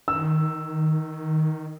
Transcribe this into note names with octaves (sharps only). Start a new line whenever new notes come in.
D#3 E6